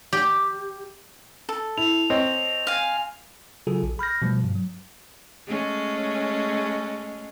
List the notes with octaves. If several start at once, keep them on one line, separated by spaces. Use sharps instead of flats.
G4
A4
E4 F7
C4 C#5 D#5
F5 G#5
C#3 F#3 F4 F#4 G#4 A4
A#1
B5 F6 G6 A#6
B2 F3 G3 A3
G2
F#3
G#3 A3 C#4